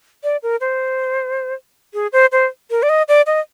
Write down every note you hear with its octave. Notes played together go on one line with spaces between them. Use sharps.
D5
A#4
C5
G#4
C5
C5
A#4
D5
D#5
D5
D#5